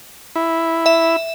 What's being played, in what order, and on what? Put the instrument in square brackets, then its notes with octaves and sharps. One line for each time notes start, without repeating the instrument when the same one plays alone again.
[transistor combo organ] E4
[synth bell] E5 E7